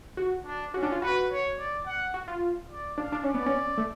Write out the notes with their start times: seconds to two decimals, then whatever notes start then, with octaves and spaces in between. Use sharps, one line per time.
0.17 F#4
0.45 D4
0.74 C#4 F#4
0.83 D4
0.92 F4
1.02 F#4 B4
1.30 C#5
1.58 D5
1.86 F#5
2.14 F#4
2.28 F4
2.71 D5
2.98 D4 F5
3.12 D4
3.24 C#4 D5
3.34 B3
3.46 C#4
3.78 A3